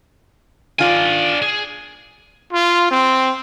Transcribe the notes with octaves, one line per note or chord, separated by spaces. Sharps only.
D#3 D4 F4 D5 G#5
G#4
F4
C4